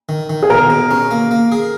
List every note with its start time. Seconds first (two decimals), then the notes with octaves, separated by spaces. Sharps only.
0.09 D#3
0.30 D#3
0.43 G#4
0.50 B2 A#4
0.70 B2
0.91 C#4
1.11 A#3
1.31 A#3
1.52 G#4